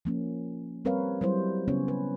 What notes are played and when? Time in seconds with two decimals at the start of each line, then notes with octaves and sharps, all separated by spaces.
0.05 F3 A#3 C#4
0.85 G3 C4 A#4 B4 C#5 F5
1.21 F#3 G3 E4 C5
1.68 C#3 B3 C#4 C#5
1.88 B4